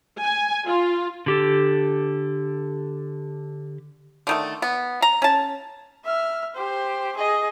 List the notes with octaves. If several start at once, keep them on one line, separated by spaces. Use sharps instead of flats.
G#5
F4
D3 G4 A4
D3 D#3 A3
B3
A#5
C#4 A5
E5 F6
G4 C5
G#4 D#5